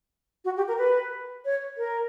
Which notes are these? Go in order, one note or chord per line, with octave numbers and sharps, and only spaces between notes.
F#4
G4
A#4
B4
C#5
A#4